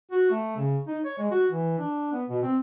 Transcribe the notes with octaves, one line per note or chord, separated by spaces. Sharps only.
F#4
A3
C#3
D#4
C#5
G#3
F#4
E3
D4
B3
B2
C4